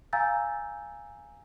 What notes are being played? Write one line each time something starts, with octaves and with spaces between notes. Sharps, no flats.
F5 G#5 A#5 E6 G6 A6